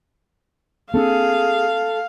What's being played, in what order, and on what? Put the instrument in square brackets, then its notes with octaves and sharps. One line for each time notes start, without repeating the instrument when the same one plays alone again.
[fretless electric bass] A#3 C4 D4 [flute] G#4 [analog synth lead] A4 [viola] F5